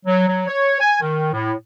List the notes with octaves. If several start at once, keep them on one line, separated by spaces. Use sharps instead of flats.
F#3
F#3
C#5
G#5
D#3
A2